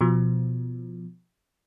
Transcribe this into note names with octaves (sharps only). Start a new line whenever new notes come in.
B2 F3